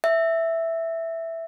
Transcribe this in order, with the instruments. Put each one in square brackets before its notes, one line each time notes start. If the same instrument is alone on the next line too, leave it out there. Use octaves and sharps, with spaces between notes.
[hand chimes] E5